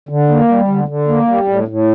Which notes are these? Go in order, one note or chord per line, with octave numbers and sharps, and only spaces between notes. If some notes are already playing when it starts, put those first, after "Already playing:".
D3
A#3
G3
D3
D3
A#3
G3
A2
A2